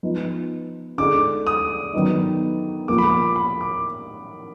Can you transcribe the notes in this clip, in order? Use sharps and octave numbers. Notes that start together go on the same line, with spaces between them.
F3 B3 D#4
D3 G#3 D#4 D6
D#6
D#3 F#3 B3 D#4
A#2 F3 A#3 D6
B5
D6
B5
D6